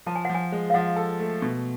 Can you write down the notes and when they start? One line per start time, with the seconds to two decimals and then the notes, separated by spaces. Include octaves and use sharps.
0.06 F3 A5
0.16 G#5
0.25 F#5
0.29 F3
0.34 G#5
0.52 G#3
0.70 F5
0.74 F3 F#5
0.96 A4
1.20 A3
1.42 B2